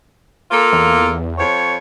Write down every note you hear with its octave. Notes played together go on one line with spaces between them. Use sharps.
A#3 F4 A4
E2
F2 C#5